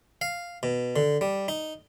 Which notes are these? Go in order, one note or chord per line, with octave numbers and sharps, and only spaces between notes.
F5
B2
D3
G3
D#4